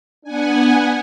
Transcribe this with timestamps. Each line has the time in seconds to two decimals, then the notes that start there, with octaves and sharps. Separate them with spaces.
0.24 B3 D4 F#5 G#5